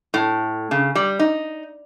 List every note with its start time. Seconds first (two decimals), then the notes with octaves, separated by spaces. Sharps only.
0.14 A2
0.71 C#3
0.95 G3
1.19 D#4